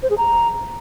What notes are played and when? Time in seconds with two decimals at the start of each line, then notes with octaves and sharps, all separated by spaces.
0.03 C5
0.10 G#4
0.18 A#5